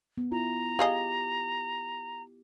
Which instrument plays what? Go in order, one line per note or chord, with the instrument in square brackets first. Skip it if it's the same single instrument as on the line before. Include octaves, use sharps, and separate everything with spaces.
[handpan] B3
[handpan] E4 F4 [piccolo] A#5
[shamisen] F4 G#4 D#5 [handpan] G4